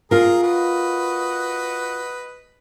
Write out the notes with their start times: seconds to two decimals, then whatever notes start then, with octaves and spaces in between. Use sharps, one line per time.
0.11 F4 G#4 A#4 A#5
0.43 F#4 B4 D#5